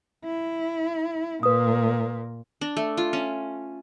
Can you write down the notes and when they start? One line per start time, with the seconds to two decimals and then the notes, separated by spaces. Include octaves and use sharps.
0.24 E4
1.43 A#2 B4 D#6
2.61 D4
2.77 A3
2.97 F4
3.13 C#4